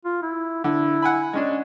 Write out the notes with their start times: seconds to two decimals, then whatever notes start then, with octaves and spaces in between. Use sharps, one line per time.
0.05 F4
0.22 E4
0.64 D3 E4
1.02 F#5 G#5 B5
1.33 G#3 C#4 D4